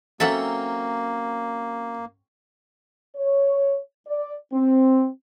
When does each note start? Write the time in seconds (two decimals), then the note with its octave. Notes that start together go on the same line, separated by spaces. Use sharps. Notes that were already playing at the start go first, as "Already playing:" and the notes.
0.20 F#3 A#3 C4 C#4 A4 E5 F#5
3.16 C#5
4.06 D5
4.51 C4